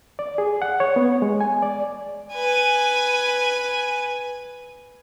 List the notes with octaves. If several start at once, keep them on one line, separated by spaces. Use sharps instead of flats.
D5
G#4
F#5
C#5
B3
G#3
G#5
D5
B4 G#5